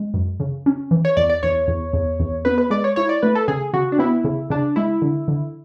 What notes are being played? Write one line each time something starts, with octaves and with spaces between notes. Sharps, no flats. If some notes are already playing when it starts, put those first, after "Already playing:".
Already playing: G#3
F#2
C#3
C#4
E3
C#5
E2 D5
D5
E2 C#5
E2
E2
E2
B3 B4
B4
G#3 D5
C#5
E4 C#5
D5
A3 B4
A4
C#3 G#4
C#3 F#4
D4
B3 E4
C#3
C#3 D4
G#3 E4
D3
D3